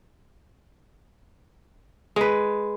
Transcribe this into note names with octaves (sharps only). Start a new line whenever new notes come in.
G#3 B4